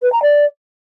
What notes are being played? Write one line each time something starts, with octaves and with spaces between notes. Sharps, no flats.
B4
A#5
D5